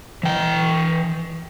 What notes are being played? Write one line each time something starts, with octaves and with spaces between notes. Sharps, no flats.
E3 G5